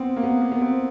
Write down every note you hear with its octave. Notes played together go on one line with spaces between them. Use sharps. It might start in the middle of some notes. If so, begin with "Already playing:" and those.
Already playing: B3 C4
A#3
B3
A#3
B3
C4